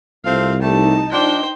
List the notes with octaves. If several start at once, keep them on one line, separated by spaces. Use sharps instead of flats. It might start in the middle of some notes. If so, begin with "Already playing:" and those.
C2 A3 C4 F4 F5
G3 A3 D#4 A5
F3 D4 C5 G5